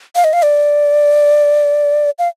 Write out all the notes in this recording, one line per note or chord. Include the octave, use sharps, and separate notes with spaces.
F5
D#5
F5
D5
F5